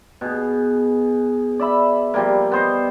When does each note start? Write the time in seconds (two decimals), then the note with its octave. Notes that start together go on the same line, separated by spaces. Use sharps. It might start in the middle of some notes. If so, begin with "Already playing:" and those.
0.21 B2 G#4
1.59 D5 E5 B5
2.14 F3 G3 A#3
2.52 B3 C5 D#5